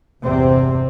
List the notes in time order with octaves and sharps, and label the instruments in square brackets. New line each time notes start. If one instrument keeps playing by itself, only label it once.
[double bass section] G1 E2 C3 C4